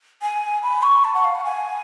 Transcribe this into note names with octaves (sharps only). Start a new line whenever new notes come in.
G#5
B5
C#6
A5
F#5
F5
F#5
G#5